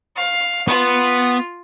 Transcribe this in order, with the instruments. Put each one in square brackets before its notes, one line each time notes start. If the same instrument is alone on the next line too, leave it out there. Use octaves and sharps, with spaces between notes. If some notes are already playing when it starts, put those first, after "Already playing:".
[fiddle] F5
[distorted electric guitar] B3 [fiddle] F4